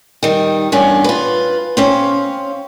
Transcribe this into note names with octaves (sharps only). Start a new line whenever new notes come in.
D#3 G3
E2 G2 C#4 D4
F4 B4
C4 C#4 F5